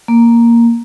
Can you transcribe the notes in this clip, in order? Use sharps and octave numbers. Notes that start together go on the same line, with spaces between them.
A#3